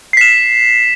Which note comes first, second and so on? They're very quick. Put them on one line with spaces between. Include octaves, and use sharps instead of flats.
C7 B6 E7